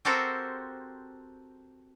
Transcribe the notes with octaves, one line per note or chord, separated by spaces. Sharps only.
C4 F#4 G4 A4 A#4 C5